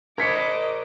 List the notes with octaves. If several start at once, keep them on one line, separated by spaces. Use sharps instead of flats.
A#4 C5 D#5 D6 G#6 B6 C#7